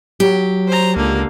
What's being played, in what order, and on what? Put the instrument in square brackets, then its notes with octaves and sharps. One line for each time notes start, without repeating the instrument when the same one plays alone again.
[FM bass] F#3 [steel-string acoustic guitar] G4
[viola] C5 A#5
[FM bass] C#2 [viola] D3 A#3